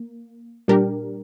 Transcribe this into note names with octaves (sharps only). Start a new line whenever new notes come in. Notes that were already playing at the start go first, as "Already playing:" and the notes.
Already playing: A#3
A#2 G3 D4 G4 A#4